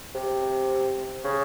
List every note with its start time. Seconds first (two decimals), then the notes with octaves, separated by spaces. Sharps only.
0.15 C3
1.24 C#3